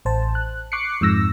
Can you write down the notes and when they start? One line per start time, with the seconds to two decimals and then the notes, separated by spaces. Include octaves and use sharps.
0.05 A1 C5 A5
0.35 F#6
0.72 C#6 D6 F#6 C7 C#7
1.01 F2 G#2 E6 A#6